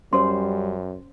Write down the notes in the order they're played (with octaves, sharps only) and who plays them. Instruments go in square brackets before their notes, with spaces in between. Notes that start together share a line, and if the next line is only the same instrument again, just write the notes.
[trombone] F#2 [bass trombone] G3 [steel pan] C#4 C5 [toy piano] C6